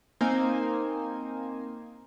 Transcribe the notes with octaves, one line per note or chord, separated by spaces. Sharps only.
A#3 C4 D#4 C5 G#5